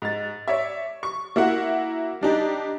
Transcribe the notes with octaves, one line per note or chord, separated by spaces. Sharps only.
G#2 A6
C#5 D5 E5
C#6
A#3 E4 F#4 F#5
G3 D4 D#4 G4